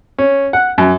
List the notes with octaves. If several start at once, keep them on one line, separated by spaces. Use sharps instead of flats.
C#4
F#5
F#2